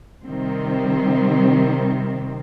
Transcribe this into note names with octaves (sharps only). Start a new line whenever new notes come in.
C3 D#3 G3 C4